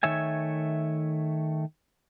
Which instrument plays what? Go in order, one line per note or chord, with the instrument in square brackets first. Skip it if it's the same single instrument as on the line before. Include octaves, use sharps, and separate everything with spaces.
[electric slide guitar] D#3 A3 C#5 E5 G#5